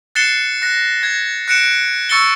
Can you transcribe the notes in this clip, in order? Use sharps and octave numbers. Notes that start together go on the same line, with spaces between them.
F#6 A6 C7 C#7 E7 G7
F#6 A#6
G#6 A#6
F#6 A#6 C#7 D7 E7
C#6 E6 A6 C#7 G7